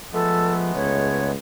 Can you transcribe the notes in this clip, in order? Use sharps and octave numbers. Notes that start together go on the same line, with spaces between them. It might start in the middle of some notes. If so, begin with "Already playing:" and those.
F3 G#3 A3 B3 A4
C#2 C#5